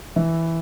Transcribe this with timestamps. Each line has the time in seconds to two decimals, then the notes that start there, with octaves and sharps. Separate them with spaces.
0.16 E3 E4